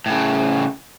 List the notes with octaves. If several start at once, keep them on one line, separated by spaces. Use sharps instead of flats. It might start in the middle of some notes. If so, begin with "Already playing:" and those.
A2 C#3